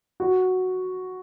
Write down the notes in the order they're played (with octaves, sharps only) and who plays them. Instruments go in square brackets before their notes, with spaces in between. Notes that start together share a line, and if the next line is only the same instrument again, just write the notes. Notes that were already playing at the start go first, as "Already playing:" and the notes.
[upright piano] F#4